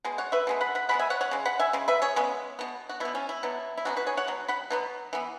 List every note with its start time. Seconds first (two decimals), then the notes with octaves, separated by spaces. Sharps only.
0.05 B2 G#3
0.18 C#5 F#5
0.32 B4 E5
0.47 B2 G#3 B3
0.61 F#5 B5
0.75 F#5 B5
0.89 C#3 G#3 B3 F#5 B5
0.99 E5 G#5
1.10 C#5 F#5
1.21 C#5 F#5
1.31 C#3 G#3
1.45 F#5 B5
1.59 E5 G#5
1.73 C#3 G#3
1.88 B4 E5
2.02 G#4 C#5
2.16 C#3 G#3 B3
2.59 B2 B3
2.89 F#4
3.00 B2 B3 E4
3.15 C#4
3.29 E4
3.43 B2 F#3 B3
3.77 E4
3.85 B2 F#3 B3 C#4 F#4
3.96 F#4 B4
4.06 G#4 C#5
4.17 C#5 F#5
4.27 B2 F#3
4.48 F#5 B5
4.70 B2 F#3 B3
5.13 E3 B3